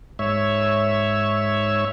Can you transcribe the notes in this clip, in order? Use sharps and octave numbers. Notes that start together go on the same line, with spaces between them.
G#2 C#5 E5